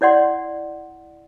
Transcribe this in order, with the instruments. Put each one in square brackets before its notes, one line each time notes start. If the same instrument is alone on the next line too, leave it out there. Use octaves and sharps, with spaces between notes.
[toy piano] E4 C#5 D5 F#5 C6